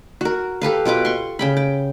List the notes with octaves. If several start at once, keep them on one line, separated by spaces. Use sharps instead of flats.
F#4 A#4
G4 A4 B4 F5
B2 F4 B4 D6
C6 C#6
C#3 G5 B5
G5